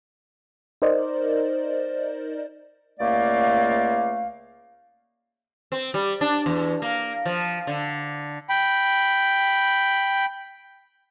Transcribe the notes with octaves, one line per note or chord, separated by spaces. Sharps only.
D#4 A#4 C5 D5 D#5
C#2 A3 A#3 D5 F5
C4
G3
D4
E2
A#3
F3
D3
G5 B5